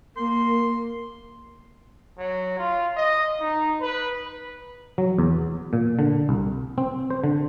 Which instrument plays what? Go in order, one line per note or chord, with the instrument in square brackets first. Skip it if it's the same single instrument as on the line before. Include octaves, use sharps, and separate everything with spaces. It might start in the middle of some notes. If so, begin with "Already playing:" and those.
[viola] A#3 [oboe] C6
[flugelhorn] F#3
F4
D#5
D#4
B4
[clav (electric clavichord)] F#3
E2
A#2
D3
C2
C4
C5
D3